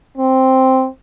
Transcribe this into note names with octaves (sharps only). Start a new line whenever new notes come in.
C4